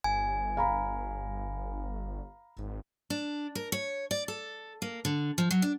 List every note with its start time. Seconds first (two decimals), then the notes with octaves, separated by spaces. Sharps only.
0.04 G1 G#5
0.57 F5 A#5 B5
2.58 G#1
3.10 D4
3.55 A#4
3.72 C#5
4.11 D5
4.28 A4
4.82 A#3
5.05 D3
5.38 F3
5.51 F#3
5.62 D4